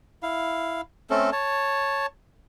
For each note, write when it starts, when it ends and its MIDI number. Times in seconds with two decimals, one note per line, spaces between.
0.23 0.81 64
0.23 0.81 77
1.10 1.30 57
1.10 1.30 60
1.10 1.30 61
1.10 1.30 69
1.32 2.06 73
1.32 2.06 81